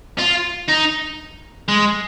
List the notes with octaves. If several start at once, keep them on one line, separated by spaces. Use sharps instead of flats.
F4
D#4
G#3